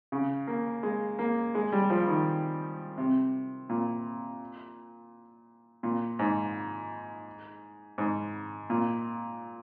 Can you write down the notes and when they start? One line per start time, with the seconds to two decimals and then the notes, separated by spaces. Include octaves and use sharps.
0.12 C#3
0.47 A#3
0.83 G#3
1.19 A#3
1.55 G#3
1.72 G3
1.90 F3
2.08 D#3
2.98 C3
3.69 A#2
5.83 A#2
6.19 G#2
7.98 G#2
8.70 A#2